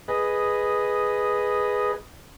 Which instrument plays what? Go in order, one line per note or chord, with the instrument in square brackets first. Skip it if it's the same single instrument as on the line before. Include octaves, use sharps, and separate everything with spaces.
[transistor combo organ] G#4 B4 D#5